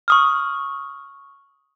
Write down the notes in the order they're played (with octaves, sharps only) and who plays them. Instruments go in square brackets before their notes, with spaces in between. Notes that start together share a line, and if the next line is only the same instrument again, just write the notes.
[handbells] C#6 D#6 F6